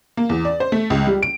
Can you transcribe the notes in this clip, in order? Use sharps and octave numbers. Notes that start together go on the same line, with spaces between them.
A#3
E2
D5
C5
A3
C#2
G3
D7